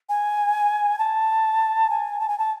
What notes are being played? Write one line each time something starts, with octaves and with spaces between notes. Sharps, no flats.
G#5
A5
G#5
A5
G#5
A5